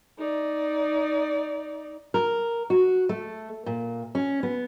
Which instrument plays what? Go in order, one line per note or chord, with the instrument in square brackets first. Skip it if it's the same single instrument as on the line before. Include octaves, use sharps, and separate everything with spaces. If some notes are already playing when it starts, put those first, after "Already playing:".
[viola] D#4 D5
[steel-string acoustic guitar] A#4
F#4
A3
A#2
C#4
B3